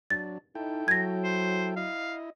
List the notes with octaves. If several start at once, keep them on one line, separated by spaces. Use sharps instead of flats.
F#3 D4 A6
D#4 E4 A4 G5
F#3 G#6 A#6
C5
E4 D#5 F5